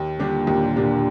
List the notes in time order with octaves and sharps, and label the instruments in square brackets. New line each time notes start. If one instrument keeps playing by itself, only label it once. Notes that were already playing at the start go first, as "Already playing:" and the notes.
Already playing: [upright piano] D#2
[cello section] A#2 [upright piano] D3 G3 D4 G4
[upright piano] D#2
D3 G3 D4 G4